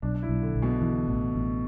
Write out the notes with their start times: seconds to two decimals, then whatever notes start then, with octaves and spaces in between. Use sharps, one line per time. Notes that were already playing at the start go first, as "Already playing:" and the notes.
0.02 B1 D4
0.14 D4
0.23 E4
0.29 B1
0.42 D3
0.55 B1
0.62 B2
0.82 D3 E3
1.08 A1
1.36 A1